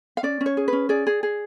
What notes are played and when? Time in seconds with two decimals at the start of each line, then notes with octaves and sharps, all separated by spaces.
0.17 F5
0.23 C#4 D5
0.41 C#4
0.46 C#5
0.57 G#4
0.68 C#4 B4
0.89 G#4 D5
1.07 G#4
1.23 G#4